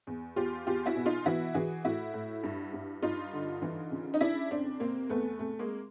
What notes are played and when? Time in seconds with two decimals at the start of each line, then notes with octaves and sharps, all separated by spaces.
0.07 E2
0.36 E2 F4 G4
0.67 E2 F4 G4
0.86 E4 F#4
0.96 B2
1.06 D#4 F4
1.26 E3 E4 F#4
1.54 E3 F#4 G#4
1.84 A2 E4 F#4
2.14 A2
2.43 G2
2.73 G2
3.02 G2 D#4 F4
3.33 D3
3.62 E3
3.91 C#3
4.14 D#4
4.21 C#3 D4 E4
4.51 F2 C4 D4
4.80 C3 A#3 C4
5.10 E2 A3 B3
5.39 C3 A3
5.59 G#3 A#3